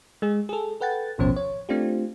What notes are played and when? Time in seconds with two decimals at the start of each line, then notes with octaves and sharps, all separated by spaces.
0.22 G#3 G#4
0.49 G#4 A4
0.81 A4 B4 F#5 G5 A6
1.18 A1 D#2 B2 F3 C#4 C5
1.36 C#5
1.69 A3 C4 D4 F4 G4